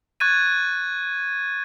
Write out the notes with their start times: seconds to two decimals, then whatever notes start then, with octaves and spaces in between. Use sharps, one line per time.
0.20 C#6 F#6 G#6 A6 D#7